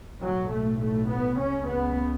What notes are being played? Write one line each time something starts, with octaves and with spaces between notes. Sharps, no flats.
B1 A2 F#3
A3
A3
B3
C#2 C#3 C#4
B3